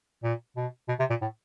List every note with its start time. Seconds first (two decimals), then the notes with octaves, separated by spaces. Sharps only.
0.23 A#2
0.56 B2
0.88 B2
0.99 C3
1.10 A#2
1.21 A2